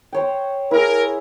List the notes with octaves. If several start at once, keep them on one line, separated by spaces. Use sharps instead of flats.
C5 C#5 G5
E4 G#4 A#4